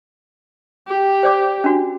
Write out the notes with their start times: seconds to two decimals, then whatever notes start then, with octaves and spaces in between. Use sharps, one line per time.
0.88 G4
1.23 C5 D5 D6
1.64 C#4 D4 F#4